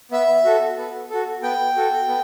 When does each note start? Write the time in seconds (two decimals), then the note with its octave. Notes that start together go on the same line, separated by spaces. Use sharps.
0.11 B3 E5
0.45 F#4 A4
0.77 B3
1.10 F#4 A4
1.43 B3 G5
1.76 F#4 A4
2.08 B3